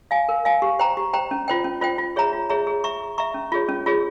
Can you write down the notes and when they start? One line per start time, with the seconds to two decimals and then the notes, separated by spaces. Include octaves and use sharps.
0.11 F5 G#5
0.29 A#4
0.45 F5 G#5
0.62 G4
0.79 C5 G5 A#5
0.97 G4
1.13 C5 G5 A#5
1.31 C#4
1.48 F4 C5 G5
1.64 C#4
1.81 F4 C5 G5
1.98 F4
2.16 G#4 C#5 E5 A#5
2.33 F4
2.50 G#4 C#5 E5 A#5
2.67 G#4
2.84 E5 A#5 C#6
3.01 G#4
3.18 E5 A#5 C#6
3.34 C#4
3.52 F4 G#4 C#5
3.69 C#4
3.86 F4 G#4 C#5